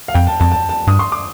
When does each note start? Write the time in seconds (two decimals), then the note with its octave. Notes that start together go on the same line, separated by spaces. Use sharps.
0.08 F5
0.14 F2 G5
0.27 A5
0.40 F2 A5
0.52 A5
0.69 A5
0.87 G2 D#6
0.99 C6
1.12 D6